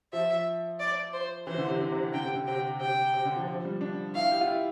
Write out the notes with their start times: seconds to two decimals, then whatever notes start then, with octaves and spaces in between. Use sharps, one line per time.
0.13 F3 E5
0.80 D5
1.13 C5
1.47 E3 C5
1.57 D3
1.69 C3
1.81 D3
1.92 C3
1.97 D3
2.14 D3 G5
2.25 C3
2.36 D3
2.47 C3 G5
2.81 C3 G5
3.14 C3
3.25 D3
3.36 F3
3.48 F3
3.65 G3
3.81 D4
4.15 E4 F5
4.31 G4
4.41 F4
4.47 E4